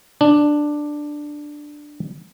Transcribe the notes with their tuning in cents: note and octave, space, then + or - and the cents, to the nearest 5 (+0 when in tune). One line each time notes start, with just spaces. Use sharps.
D4 +10